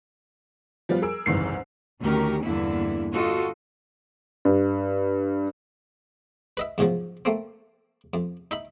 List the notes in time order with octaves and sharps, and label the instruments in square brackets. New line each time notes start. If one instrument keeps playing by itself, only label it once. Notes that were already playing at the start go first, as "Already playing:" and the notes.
[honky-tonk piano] F3 G3 B3 F4
G#4 A#4 E6 D7
F#1 C2 G#2 D#3 E3 C7
[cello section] D2 D#3 C#4 G4 A#4
E2 G2 D3 A#3 E4
F4 F#4 A4 D#5
[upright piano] G2
[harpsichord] B4 D#5 E5
E2 G#2 C#3 F3 F#3
A3 A#3 C4
F2
D#4 E5 B5